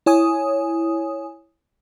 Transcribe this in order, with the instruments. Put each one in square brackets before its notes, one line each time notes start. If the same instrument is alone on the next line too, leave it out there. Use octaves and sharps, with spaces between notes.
[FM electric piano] E4 C#5 G#5 D#6